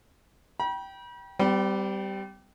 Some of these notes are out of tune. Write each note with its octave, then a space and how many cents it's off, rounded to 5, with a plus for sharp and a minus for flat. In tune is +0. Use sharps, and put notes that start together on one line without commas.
G5 -10 B5 -40
G3 -10 C4 -45 G5 -10